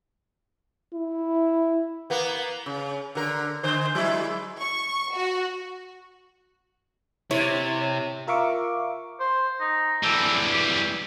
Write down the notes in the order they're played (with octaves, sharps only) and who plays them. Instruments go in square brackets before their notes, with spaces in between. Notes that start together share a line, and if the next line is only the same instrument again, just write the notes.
[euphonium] E4
[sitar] A#3 B3
C#3
D3 A#4
D3 C5
F#3 G#3 E4
[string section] C#6
F#4
[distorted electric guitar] C3 [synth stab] E4 G#6 A6 [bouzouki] C#5
[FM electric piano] F4 A#4 E5 F5 C#6 D6
[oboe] C5
D#4
[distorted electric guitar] E3 G3 [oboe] A4
[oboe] G4